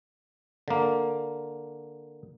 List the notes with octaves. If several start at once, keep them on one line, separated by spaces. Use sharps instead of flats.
D3 A#3